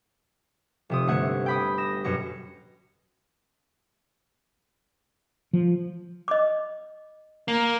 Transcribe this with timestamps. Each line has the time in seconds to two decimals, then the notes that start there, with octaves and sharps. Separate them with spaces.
0.89 F1 C3 D#6
1.07 G1 A3 F#5 G#6
1.46 G5 B5 D#6
1.78 D#6 A#6 E7
2.04 F#2 B2 A#6 C#7
5.53 F3
6.28 D#5 D6
7.48 A#3